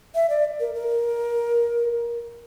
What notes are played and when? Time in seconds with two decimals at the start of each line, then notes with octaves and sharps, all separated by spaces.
0.15 E5
0.30 D5
0.60 A#4
0.75 A#4